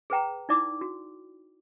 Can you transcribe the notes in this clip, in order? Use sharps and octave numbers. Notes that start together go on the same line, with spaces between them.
G#4 B4 G5 A#5
D#4 E4 D5 D6
F#4